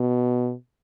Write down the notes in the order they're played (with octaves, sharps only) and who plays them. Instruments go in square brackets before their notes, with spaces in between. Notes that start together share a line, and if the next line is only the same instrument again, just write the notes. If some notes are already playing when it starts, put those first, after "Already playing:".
Already playing: [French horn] B2